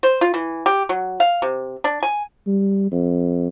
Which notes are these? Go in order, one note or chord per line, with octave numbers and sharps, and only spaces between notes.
C5
F4
E3
G4
F#3
F5
C3
D4
G#5
G3
F2